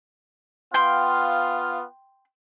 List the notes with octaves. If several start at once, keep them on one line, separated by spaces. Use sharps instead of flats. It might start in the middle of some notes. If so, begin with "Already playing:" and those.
B3 F4 F5 G5 C6